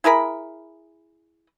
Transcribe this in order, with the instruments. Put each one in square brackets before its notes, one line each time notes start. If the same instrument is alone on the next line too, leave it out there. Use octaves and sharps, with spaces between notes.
[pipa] E4 G#4 A#4 B5